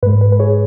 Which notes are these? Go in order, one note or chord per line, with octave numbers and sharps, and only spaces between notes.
G#2 G#3 B4
B4
B4
G#4 C#5